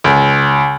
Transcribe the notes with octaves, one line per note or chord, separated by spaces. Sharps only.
C#2